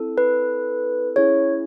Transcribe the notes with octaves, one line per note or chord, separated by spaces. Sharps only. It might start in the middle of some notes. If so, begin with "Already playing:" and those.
Already playing: C4 E4 A4
B4
C#4 E4 G#4 C#5